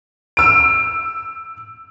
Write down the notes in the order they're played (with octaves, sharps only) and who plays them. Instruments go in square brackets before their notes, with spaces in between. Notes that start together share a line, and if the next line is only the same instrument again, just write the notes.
[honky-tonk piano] E6 D7